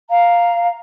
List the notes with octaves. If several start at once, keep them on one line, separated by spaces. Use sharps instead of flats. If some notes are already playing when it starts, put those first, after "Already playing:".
F5 A#5